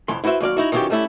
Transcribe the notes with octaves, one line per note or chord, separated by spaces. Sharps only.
C2 F2 E3 C6
E4 F#4 B4 C5 E5
D#2 F#3 D5 F5
D#4 E4 F#4
D#3 E3 F#3 C#4 F4 G4
G3 A3 C#4 E4